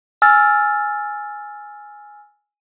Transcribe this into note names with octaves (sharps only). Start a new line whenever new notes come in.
G#5 E6 F6 A6